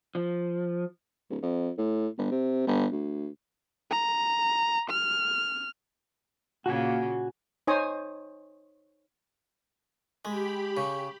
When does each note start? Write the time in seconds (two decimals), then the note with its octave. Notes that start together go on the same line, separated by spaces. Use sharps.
0.15 F3
1.30 D1
1.42 F2
1.78 A2
2.18 G1
2.31 C3
2.67 G1
2.92 D2
3.91 A#5
4.90 F6
6.66 A#2 C#3 A#3 F#4 G#5
7.67 D#4 C5 C#5 G#5 D#6
10.25 G#3 G4 B5
10.77 C#3